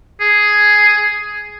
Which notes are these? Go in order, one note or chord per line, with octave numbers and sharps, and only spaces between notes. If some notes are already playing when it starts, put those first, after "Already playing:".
G#4